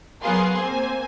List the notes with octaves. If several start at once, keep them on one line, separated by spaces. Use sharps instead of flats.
F#3 B3 G#4 A#4 F5 C6
A#3 C4 C5 G#5